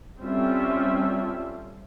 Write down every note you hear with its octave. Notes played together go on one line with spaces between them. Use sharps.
G3 C4 C#4 F4 A4 E5